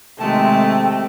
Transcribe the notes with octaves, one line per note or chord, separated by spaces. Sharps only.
C3 D#3 G#3 A3 C4 G5 A5